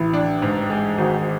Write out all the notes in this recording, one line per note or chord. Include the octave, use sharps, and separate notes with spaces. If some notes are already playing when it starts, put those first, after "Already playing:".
Already playing: A1 E4
D4
G#2
G#3
G#1 F#4